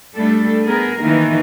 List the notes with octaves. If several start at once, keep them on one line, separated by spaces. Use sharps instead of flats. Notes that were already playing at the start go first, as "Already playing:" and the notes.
G3 A3 D4 A4
B3 G#4 A#4
D#3 E3 A#3